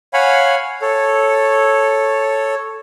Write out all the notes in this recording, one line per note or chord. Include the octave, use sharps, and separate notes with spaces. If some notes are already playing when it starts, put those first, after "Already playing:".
C#5 F5 F#5 G#5 B5
A4 C#5